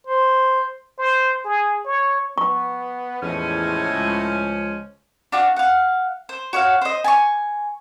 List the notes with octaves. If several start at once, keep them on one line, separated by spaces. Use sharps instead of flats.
C5
C5
G#4
C#5
B3 C#6
E2 A2 F3 G#3 C#4
C#2
D4 F#4 F5
F5 F#5
C5
F#4 C#5 F5
C5 D#5
G#5 A5 C#6